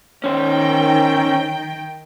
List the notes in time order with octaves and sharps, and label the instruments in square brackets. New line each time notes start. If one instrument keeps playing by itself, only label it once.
[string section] D#3 G5 [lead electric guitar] C#4 C5